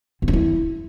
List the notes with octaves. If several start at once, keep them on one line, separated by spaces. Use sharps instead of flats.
C4
C#4
E4